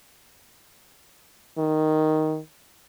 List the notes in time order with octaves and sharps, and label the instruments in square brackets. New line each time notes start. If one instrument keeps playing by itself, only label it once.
[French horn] D#3